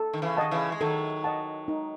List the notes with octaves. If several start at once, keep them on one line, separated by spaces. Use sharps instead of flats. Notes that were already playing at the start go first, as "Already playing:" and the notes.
Already playing: A4
D#3
C#3 E3
D#3 D#5 F#5 A5
C#3 E3
G#3
D#3 F#3 A4
D#5 F#5 A5
D#4